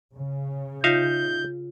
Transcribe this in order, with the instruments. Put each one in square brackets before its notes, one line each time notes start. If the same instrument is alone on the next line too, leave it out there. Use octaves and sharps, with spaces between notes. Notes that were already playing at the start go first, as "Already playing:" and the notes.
[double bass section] C#3
[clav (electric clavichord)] D#4 E5 F5 [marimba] F4 A#6 [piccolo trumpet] G6